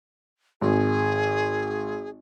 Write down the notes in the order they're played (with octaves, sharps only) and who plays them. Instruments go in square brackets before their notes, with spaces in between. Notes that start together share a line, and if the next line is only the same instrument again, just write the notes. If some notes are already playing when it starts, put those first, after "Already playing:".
[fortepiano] G#1 [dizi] G#4